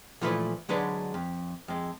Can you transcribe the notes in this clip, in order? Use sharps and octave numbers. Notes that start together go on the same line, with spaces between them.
A#2 E3 F3 A3 E4 B4
D3 F#3 G#3 D4 B4
F2
F2 G#3